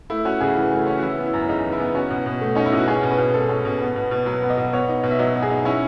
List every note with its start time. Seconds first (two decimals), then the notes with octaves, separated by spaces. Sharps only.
0.10 A3 E4
0.25 C#4 F#4
0.40 C#3 G#4
0.57 E3
0.72 A3
0.87 C#4
0.98 F#4
1.02 E3 E4
1.18 B3
1.26 E4
1.33 F#2
1.49 C#3 D#4
1.64 E3
1.72 E4
1.80 B3
1.95 C#4 F#4
2.10 B2
2.26 B2
2.41 A3
2.55 C#4 D#4
2.66 E4
2.72 B2 F#4
2.88 C#4 G#4
3.03 B2
3.10 B4
3.18 B2
3.34 G#3 A4
3.49 C#4
3.65 B2
3.81 B3
3.96 B2
4.11 B2
4.26 F#3 B4
4.42 B3
4.50 D#5
4.57 B2
4.73 B3 C#5
4.88 D#4
5.03 B2
5.11 E5
5.19 F#3 D#5
5.35 B3
5.42 G#4
5.50 D#4
5.65 C#4 E4